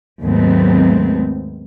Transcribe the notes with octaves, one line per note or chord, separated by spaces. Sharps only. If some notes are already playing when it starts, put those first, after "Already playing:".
D#2 G#2 F#3 A3 B3 C4